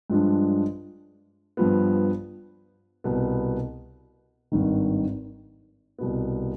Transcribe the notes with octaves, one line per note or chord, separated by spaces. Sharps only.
G2 F3 G#3 D4
G2 F3 B3
C2 B2 B3
G#1 G2 D#3
C2 B2 B3